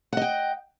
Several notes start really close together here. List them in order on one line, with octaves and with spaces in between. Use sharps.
F#5 D#5 G5